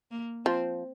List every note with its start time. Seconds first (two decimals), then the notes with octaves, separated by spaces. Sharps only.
0.11 A#3
0.45 F3 C4